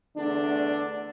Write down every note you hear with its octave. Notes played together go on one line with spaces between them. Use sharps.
E2 D3 A3 D4